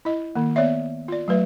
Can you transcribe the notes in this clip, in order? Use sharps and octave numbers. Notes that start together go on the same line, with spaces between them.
E4 D#5
D#3 A#3
B3 C#5 D5 E5
F4 D5
F#3 A3 B4 E5